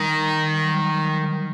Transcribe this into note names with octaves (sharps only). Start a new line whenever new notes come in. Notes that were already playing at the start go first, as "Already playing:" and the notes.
Already playing: D#3 G3
G3
F#3
G3